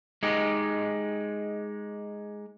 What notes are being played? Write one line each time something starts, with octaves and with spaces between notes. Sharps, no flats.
G#3 D#4 G4